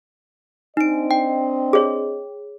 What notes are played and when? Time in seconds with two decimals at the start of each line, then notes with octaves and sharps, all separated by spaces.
0.77 C4 D4 D#4 D#5 D7
1.11 G5
1.73 G#4 C#5